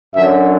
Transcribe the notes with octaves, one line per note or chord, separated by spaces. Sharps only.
F#2 D3 F#3 E5